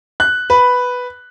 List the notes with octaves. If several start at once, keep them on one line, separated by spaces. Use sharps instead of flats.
F#6
B4